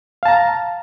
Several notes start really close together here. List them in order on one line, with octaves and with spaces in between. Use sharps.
F5 A5 A#5